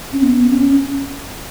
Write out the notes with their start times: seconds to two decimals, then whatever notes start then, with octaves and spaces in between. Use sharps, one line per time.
0.13 C#4
0.22 B3
0.51 C#4